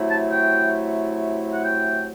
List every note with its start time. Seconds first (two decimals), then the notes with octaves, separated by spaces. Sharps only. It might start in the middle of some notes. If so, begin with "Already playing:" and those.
Already playing: C3 F#3 A3 E4
0.11 A5
0.32 G5
1.53 F#5
1.64 G5